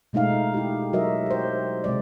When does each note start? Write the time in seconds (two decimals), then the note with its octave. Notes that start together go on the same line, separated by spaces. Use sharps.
0.13 B2 G#3 A3 D#4 F5
0.54 E4 G4
0.93 F#3 F#4 A#4 D#5 E5
1.26 G4 C5
1.84 C3 G#3 D5